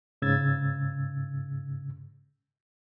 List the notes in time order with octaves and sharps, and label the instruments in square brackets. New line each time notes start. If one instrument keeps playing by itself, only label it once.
[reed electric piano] G#2 C#3 E6 G#6 A6